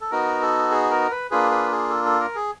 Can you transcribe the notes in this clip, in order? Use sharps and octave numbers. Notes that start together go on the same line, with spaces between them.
A4
B3 D#4 F#4 A#4
A4
G#4
A#4
B4
A#3 D4 F4 G#4 B4
B4
G#4
A4
A4
A#4
G#4